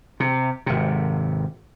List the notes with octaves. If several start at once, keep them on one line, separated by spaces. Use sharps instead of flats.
C3
G#1 C3